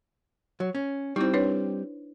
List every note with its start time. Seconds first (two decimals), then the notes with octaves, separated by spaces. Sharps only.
0.60 F#3
0.75 C#4
1.16 G3 C4 D#4 E4 C5
1.34 D4 B4 C#5